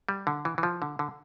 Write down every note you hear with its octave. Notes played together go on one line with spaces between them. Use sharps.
G3
D3
E3
E3
F3
D3
D3